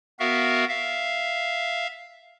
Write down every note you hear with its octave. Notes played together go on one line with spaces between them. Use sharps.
B3 F#4 A#4 E5 F5
E5 F5